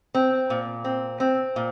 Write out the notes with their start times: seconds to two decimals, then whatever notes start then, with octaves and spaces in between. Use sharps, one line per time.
0.15 C4
0.50 A#2
0.85 C4
1.20 C4
1.56 A#2